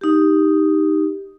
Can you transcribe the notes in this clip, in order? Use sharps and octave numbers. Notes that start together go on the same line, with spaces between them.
D#4 G4